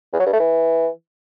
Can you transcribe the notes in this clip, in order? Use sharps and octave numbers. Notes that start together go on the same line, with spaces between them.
E2
F#3
G2
A3
E3